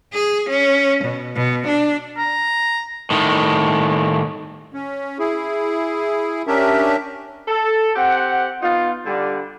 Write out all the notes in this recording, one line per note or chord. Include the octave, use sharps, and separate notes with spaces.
G#4
C#4
B2
B2
D4
A#5
A2 D#3
C#4
E4 G#4
C#4 D4 G4 A#4 E5
A4
C4 G4 F#5
B3 D#4 F4
D3 G3